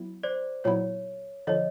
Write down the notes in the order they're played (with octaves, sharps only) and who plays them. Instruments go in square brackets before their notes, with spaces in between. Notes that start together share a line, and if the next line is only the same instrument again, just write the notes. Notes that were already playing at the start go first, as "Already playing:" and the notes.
Already playing: [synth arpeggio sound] F#3 B3 E4
[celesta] C5 D5
[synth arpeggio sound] A#2 F#3 B3 E4 [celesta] C#5
[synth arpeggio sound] D3 F3 [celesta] C#5 D#5